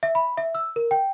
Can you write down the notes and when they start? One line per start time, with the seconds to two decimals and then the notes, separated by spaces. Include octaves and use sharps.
0.03 E5
0.15 B5
0.38 E5
0.55 E6
0.76 A#4
0.91 G5